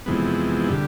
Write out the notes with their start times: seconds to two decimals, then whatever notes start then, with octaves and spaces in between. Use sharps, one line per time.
0.06 F2 C3 E3 G#3 B3
0.69 D3 G3